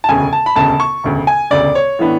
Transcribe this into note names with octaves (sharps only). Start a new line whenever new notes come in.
A5
E1 D2 C#3 G#5
A5
B5
E1 D2 C#3 A5
C#6
E1 D2 C#3
G#5
E1 D2 C#3 D5
C#5
A2 E3 B3 D4